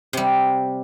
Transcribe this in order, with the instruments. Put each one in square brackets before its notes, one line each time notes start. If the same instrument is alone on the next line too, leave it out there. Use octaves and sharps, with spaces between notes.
[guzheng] C3 G3